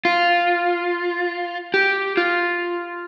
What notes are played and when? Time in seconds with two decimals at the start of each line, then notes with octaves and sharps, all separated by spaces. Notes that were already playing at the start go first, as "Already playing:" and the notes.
0.05 F4
1.74 G4
2.17 F4